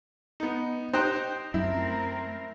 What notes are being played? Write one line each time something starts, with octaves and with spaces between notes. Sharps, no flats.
B3 D#4
D#4 G4 C5 G5 F#6
F#2 A3 C4 E4 A#4